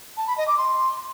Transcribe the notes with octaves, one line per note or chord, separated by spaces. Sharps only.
A5
B5
D#5
D6
C6